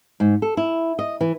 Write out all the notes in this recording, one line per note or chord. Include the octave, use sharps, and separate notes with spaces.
G#2
A4
E4
D#5
E3